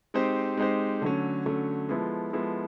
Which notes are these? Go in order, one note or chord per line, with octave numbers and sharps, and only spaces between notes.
G#3 C4 D#4 G4 C5
G#3 C4 D#4 G4 C5
D3 F#3 A3 C#4
D3 F#3 A3 C#4
F3 G#3 B3 E4 A4
F3 G#3 B3 E4 A4